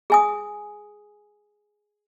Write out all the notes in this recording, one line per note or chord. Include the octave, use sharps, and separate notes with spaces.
G#4 G#5 D#6